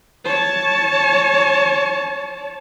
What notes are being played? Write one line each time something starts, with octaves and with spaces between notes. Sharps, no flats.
C#5 A5